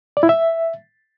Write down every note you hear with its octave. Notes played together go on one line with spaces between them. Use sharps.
D5
E4
E5